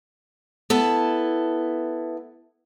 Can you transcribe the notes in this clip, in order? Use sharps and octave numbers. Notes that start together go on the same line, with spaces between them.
B3 E4 A4